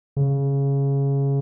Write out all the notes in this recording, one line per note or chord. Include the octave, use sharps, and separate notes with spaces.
C#3